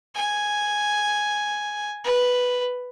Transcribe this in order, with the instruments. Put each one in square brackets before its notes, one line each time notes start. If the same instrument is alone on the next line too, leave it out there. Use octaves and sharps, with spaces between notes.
[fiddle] G#5
B4